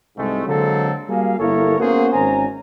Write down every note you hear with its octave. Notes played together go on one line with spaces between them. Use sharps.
C2 G#2 C3 G#3 A3
D3 F#3 G#3 A#3 C4 A4
G3 A#3 F#4 G#4 F5
G1 A#3 E4 A4 A#4 C#5
A#3 B3 C#4 F#4 G#4 C5
G#1 C#4 C5 G#5 A#5